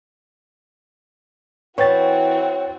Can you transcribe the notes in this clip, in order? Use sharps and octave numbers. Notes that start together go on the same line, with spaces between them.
E3 C4 F#4 B4 C#5 G5 A6